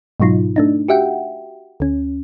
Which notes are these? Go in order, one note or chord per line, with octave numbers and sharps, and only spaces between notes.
G#2 B2 F#3 D#4 F4
A3 D4 D#4
F#4 G4 E5 F#5 G5
D2 C#4